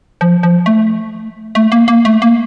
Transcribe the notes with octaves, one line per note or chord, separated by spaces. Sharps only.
F3
F3
A3
A3
A#3
A#3
A3
A#3